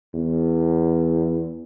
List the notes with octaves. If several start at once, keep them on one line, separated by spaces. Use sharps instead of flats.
E2